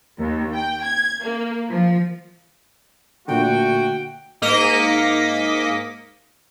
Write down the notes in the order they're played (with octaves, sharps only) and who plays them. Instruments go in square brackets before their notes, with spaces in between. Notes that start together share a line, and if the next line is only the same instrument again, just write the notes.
[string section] D#2
G5
G#6
A#3
F3
[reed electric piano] A#2 D3 [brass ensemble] A3 F#4 [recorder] G5
[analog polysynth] G#2 A#3 D#5 D6 B6 C#7